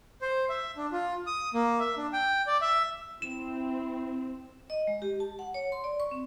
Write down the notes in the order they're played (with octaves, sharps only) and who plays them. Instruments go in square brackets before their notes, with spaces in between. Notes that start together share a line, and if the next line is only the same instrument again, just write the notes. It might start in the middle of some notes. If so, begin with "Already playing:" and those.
[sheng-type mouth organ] C5
E5
D4
F4
D#6
A#3
E5
D4
G5
D5
E5
[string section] C4 [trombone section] E4 [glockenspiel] E7
[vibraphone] D#5
G#3
G4
A5
F#5
C#5
C6
D5
C#6
C4